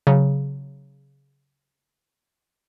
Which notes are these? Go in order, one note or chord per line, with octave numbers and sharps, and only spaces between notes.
C#3 F#3